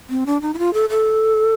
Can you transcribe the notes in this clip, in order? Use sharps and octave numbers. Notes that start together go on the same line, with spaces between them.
C4
D4
D#4
E4
F4
A4
A4